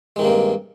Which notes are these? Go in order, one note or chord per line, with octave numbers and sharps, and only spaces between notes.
G2 C3 D#3 G#3 A#3